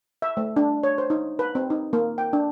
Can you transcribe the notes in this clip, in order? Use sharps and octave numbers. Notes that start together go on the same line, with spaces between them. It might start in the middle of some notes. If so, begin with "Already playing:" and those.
E5
A3
D4
C#5
C5
D#4
B4
C4
D#4
A#3
G5
D4